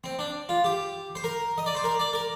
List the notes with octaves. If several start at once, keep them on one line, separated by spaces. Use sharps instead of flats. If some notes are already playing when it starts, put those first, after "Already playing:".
C4
D4
F4
G4
C5
A#4
D#5
D5
C5
A#4
D5
A#4